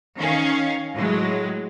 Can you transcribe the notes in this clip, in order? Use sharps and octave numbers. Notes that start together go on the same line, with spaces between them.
D#3 C#4 F5
A2 F#3 G#3